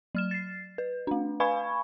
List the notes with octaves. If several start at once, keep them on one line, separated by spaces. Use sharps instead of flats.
F#3 F6 E7
A6 C7
B4
A3 D4
B4 F5 G#5 B5 C#6 G#6